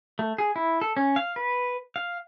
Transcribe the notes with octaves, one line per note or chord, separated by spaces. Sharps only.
A3
G#4
E4
A4
C#4
F5
B4
F5